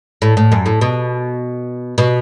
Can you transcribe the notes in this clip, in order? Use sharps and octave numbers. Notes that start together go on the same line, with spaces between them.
A2
A2
F#2
A2
B2
B2